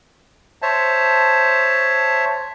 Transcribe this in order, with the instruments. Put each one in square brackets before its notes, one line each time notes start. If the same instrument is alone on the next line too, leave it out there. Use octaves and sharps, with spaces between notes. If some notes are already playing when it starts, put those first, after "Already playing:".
[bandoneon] C5 C#5 E5 A5